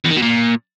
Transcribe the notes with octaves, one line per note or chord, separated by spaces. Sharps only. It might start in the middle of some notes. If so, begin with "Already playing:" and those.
E2
D#3
B2
A#2